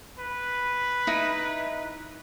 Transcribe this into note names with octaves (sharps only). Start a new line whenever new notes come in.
B4
D#4 E4